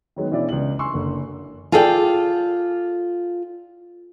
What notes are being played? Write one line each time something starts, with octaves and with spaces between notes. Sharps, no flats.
D#3 F#3 G#3 B3
B2 E3 D4 E4 D5
C#2 D4 F#7
G#5 C6 C#6 E6
F#1 D3
F4 G#4 A4 D5 D#5 G5